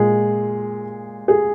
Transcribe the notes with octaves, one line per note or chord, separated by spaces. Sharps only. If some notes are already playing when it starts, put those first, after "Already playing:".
Already playing: A#2 G#3 G#4
G#4